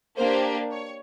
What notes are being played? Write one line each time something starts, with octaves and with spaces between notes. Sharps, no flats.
A#3 D4 G4 C5
C#5